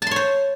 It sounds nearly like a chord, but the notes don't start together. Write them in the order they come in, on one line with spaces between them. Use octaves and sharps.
A5 C6 C#5 C5